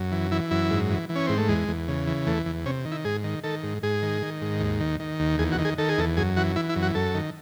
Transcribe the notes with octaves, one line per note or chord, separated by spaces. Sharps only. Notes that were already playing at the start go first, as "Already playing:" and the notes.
Already playing: F#2
E3
E3 E4
F#2 E4
G#2
E3
E3
C#4
G#2 C4
A3
E2 G#3
E2
C#3
E3
E2 A3
E2
C3 C#4
D#3
E4
G#2 G#4
D#3
D#3 A4
G#2
G#2 G#4
D#3
D#3
G#2
D#2
D#3
D#3
D#2
E2 G#4
F#4
D#3
G#4
D#3 A4
G#4
E2 A4
F#2 G#4
E3 F#4
E3 E4
E4
F#2
F#4
F#2 A4
D#3